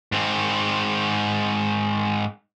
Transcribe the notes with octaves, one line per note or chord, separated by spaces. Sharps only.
G#2 C4